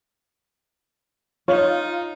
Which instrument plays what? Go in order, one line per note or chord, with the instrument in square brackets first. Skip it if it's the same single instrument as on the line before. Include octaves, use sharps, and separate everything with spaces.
[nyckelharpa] D#4 [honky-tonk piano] F4 [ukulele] C#5